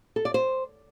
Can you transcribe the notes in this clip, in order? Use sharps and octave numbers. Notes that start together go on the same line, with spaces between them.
A4
D5
C5